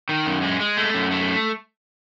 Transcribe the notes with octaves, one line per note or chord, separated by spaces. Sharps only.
D#3
F#2
G#3
G#3
A3
F#2
A3